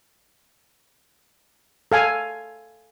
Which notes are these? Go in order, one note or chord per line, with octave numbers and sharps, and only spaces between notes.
A4 F5 G#5